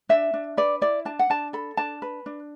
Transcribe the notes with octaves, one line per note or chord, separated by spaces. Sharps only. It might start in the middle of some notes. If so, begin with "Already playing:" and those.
D4 E5
D4
B4 D5
E4 D5
D4 A5
F#5
D4 A5
A4 B5
D4 A5
B4
D4